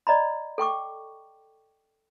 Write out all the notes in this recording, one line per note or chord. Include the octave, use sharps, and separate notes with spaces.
D5 D#5 A#5 B5
A4 G5 C#6 D6